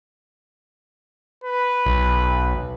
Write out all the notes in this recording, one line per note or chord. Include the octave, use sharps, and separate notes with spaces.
B4
B1